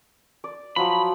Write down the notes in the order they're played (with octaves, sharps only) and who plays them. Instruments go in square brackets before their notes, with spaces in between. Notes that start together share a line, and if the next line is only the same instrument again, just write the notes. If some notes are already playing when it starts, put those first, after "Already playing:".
[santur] D5
[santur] F3 F#3 [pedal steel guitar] B5